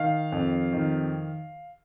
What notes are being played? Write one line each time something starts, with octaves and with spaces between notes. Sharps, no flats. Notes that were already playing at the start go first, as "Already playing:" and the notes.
Already playing: D#3 F5
F2
D#3